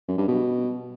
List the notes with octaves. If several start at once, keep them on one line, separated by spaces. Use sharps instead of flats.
F#2
G2
B2